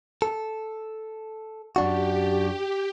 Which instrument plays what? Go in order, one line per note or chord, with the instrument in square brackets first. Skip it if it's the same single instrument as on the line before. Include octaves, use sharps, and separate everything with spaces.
[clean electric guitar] A4
[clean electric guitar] F#2 D4 F#4 [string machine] G4